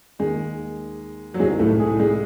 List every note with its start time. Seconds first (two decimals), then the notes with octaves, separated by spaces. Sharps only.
0.19 D#2 D#3 G#3
1.34 F#3
1.40 C2 C3 D#3 G#3
1.59 A2 A3
1.79 G#3 G#4
2.00 G#3 G#4